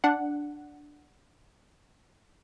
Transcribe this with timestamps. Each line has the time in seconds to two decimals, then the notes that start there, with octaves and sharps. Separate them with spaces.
0.04 D4 F#5